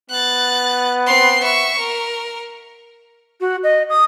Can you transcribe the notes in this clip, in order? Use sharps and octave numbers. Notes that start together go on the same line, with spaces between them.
B3 F#6 A6
C4 C6
E5 C#6
A#4
F#4
D#5
D#6